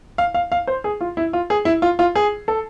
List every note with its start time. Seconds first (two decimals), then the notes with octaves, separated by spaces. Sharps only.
0.18 F5
0.34 F5
0.52 F5
0.67 C5
0.84 G#4
1.01 F4
1.17 E4
1.33 F4
1.50 G#4
1.65 E4
1.82 F4
1.99 F4
2.15 G#4
2.48 A4